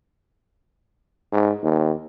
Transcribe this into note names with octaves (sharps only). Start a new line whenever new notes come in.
G#2
D#2